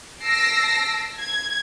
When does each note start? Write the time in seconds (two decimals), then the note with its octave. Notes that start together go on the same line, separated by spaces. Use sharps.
0.23 A5 E6 A#6 C7 D7
1.17 G#6